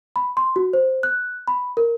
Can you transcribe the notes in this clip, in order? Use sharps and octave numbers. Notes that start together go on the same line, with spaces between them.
B5
C6
F#4
C5
F#6
B5
A#4